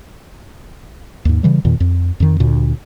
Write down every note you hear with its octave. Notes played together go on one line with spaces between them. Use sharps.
D#2 G#2
C#3 E3 G3
E2 A#2 D#3
F2
F2 D#3
D2 A#2